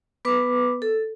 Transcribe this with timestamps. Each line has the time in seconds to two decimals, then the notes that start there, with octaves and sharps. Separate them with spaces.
0.25 B3 B4 D6
0.82 A4